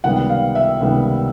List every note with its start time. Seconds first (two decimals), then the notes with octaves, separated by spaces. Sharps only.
0.04 C#2 C3 D#3 G3 B3 F#5
0.29 F5
0.55 E5
0.80 C#2 C3 D#3 G3 B3